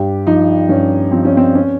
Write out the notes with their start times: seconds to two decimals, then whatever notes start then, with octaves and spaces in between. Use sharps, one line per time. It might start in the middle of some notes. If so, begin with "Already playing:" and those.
Already playing: G2 G4
0.27 F3 D#4
0.69 G2 C#4
1.12 F3 C4
1.25 C#4
1.37 C4
1.55 C#4